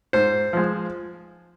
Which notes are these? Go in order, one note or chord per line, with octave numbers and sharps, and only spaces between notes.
G#2 C5
F3 G#3